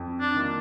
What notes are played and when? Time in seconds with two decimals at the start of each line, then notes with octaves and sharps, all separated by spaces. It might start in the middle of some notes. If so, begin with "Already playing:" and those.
Already playing: F2
0.21 D4
0.34 D#3 A#3 F4